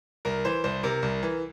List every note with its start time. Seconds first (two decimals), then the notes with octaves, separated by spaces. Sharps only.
0.25 C2 A#4
0.45 E3 C5
0.64 C2 C5
0.83 C3 A#4
1.02 C2
1.23 E3